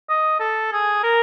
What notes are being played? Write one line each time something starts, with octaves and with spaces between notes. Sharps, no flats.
D#5
A4
G#4
A#4